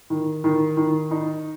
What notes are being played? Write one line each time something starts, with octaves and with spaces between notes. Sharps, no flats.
D#3
D#3
D#3
D#4